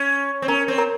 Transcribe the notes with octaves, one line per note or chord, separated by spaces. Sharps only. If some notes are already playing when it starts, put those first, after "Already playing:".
Already playing: C#4
C4
C#4 A#4 A#5
C4
A#4 A#5